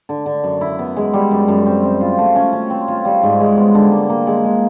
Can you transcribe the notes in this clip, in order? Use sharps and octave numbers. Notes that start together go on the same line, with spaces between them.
D3
D3
F#2
E4
B3
G#3
G3
F#2
F#2
C4
C4
F4
A3
C#4
C#4
C4
F4
G3
G#2
G#3
B3
D3
A#3
A#3
G#3
G#3